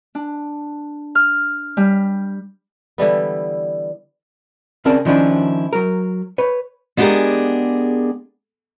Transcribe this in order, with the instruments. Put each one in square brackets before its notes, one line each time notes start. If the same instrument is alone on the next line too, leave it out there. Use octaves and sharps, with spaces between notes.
[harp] D4
F6
G3
[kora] D3 E3 G3 B3
[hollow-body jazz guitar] C#3 C4 A#4 D5 A5
D#3 F3 C#4 D4 E4
F#3 A#4
B4 C#5
[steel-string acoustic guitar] G#3 B3 D4 G4 G#4 A#4